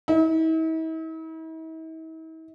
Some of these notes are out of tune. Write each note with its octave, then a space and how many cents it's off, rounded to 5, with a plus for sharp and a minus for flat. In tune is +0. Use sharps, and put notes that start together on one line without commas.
E4 -45